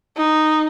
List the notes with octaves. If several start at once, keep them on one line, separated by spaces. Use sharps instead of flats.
D#4